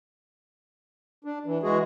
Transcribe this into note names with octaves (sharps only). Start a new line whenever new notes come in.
D4
E3
E3 G#3 F#4 G#4